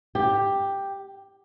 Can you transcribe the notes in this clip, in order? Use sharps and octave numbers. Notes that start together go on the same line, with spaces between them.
G4